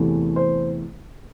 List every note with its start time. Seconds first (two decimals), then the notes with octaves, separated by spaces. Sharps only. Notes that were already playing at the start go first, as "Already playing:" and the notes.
Already playing: E2 C3 E3 A3
0.36 C5